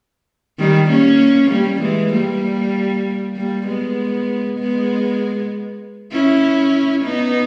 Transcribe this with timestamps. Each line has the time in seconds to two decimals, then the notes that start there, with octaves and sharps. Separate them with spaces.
0.58 D#3 G3
0.89 A#3 C#4
1.51 G3 A#3
1.82 E3 G#3
2.12 G3 A#3
3.35 G3 A#3
3.66 G#3 B3
4.58 G#3 B3
6.12 C#4 E4
7.04 B3 D#4